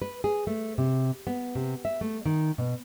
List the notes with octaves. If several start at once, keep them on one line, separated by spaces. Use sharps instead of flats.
B4
G#4
A3
C3
B3
C3
E5
A3
D#3
B2